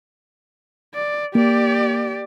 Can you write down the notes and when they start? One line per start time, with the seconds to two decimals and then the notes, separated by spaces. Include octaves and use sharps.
0.94 D5
1.35 A#3 G4 D5